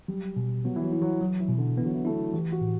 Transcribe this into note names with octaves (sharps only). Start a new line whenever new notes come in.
F#3 G3
B2
F#3 B3
E3
F#3
E4
F#3
E3 F#3
E3
B2
D3
E3 B3
F#3
E3
A3 E4
E3 G4
F#4
A2